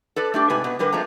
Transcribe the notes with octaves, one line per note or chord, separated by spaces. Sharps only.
A4 B4 D5
A3 D4 G4
G#2 C3 B4 G#5
B2 B4
D3 G3 A#4 B4
F3 G#3 A3 C4 A#5